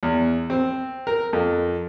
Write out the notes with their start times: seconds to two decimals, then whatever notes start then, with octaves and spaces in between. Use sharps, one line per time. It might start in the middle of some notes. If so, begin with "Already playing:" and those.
0.03 E2
0.50 C4
1.07 A#4
1.33 F2